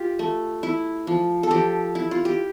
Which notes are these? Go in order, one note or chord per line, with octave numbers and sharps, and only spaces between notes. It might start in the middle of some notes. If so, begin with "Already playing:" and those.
Already playing: F4 G4
A3
E4
F3
A4
F3 G4
E4
F4
G4